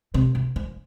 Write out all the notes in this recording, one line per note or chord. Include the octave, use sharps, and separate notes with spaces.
C3
C3
F3